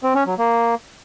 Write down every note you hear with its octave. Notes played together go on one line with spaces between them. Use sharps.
C4
C#4
F#3
A#3